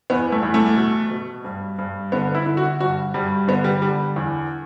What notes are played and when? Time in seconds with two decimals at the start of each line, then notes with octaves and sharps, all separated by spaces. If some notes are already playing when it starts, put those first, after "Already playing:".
0.10 E2 B3
0.32 A3
0.43 E2
0.54 A3
0.77 B2
1.11 B2
1.44 G2
1.78 G2
2.12 D3 B3
2.35 E4
2.46 D3
2.57 F#4
2.80 G2 F#4
3.14 G2 G3
3.47 D3 B3
3.64 G3
3.82 D3 G3
4.16 E2